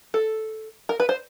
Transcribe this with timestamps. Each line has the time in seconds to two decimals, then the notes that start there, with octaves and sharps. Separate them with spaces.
0.14 A4
0.89 A#4
1.00 B4
1.09 C5